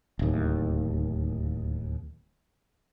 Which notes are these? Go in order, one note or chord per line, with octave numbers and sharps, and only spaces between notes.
D1 D#2